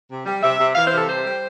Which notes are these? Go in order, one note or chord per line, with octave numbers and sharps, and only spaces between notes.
C3
G3
C3 E5
C3
E3 F5
C5
C3
A4
G3 C5
G3